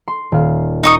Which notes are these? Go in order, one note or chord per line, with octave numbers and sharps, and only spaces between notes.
C6
D#1 F5
D#4 C#6 D#6